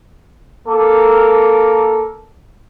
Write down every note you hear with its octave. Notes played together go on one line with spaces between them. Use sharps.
A#3 A4 A#4 D6